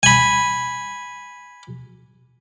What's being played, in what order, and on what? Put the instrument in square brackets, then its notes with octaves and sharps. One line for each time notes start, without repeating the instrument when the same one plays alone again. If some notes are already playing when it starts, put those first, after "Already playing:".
[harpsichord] G#5 B5